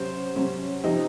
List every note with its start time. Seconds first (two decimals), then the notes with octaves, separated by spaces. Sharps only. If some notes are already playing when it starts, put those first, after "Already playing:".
Already playing: C3 F#3 C#4 C5
0.36 C3 F#3 C#4
0.84 C3 F3 C4 D#4